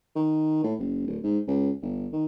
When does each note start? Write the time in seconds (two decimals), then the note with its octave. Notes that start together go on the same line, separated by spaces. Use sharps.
0.15 D#3
0.64 A2
0.79 F#1
1.07 D1
1.23 G#2
1.48 C#2
1.82 G1
2.12 D#3